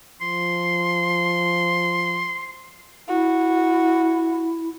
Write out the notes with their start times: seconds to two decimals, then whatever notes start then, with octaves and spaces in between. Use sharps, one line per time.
0.21 F3 C6
3.08 E4 F#4